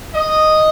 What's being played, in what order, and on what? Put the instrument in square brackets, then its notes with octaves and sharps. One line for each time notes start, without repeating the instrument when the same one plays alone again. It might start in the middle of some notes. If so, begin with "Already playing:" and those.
[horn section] D#5